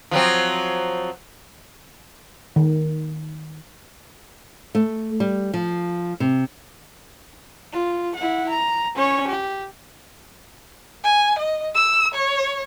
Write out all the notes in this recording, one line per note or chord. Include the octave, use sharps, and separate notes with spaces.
F3 F#3 C4
D#3
A3
G3
F3
C3
F4
E4 F#5
A#5
C#4 C#5
G4
G#5
D#5
E6
C#5